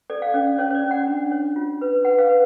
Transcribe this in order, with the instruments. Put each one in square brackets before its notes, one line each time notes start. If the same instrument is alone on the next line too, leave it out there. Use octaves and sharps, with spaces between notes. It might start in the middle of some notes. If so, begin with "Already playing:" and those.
[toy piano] A4 D5
F5
C#4 D5
C#4 C#5
C#5
D5
C#4
F#5
D4
C#5
F4
B4
B4 F#5
F5
B4